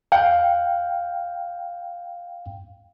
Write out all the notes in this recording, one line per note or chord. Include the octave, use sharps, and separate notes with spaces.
F5 G5